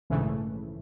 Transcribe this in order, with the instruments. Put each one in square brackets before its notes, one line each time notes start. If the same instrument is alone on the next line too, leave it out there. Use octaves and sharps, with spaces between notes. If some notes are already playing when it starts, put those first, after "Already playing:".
[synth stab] A#1 G#2 C#3 E3 A3